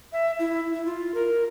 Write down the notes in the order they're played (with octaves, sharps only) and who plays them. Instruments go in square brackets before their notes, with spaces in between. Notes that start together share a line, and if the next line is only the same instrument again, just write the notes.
[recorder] E5
E4
E4
F4
A#4